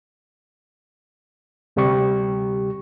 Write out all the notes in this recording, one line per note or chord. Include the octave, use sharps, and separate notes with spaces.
D2 C3 G3 G4 C#6